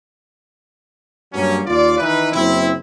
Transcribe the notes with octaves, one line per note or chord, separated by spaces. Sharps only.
G2 F#3 A#3 C#4
D#2 F4 D5
D#3 E3 D#4 B4
F#1 C4 E4